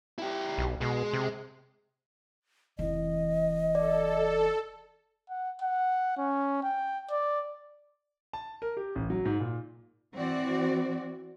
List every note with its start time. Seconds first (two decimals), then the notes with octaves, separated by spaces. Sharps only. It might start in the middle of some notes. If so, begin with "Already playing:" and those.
0.18 E4 G4
0.58 B1
0.81 B2 G#3
1.13 C3
2.79 F1 E3 D#5
3.75 A4 D5
5.30 F#5
5.62 F#5
6.17 C#4
6.63 G5
7.10 D5
8.33 A5
8.62 A#4
8.77 G4
8.95 A1
9.10 F#3
9.25 G#2
9.40 A#2
10.14 E3 C4 F#4 D5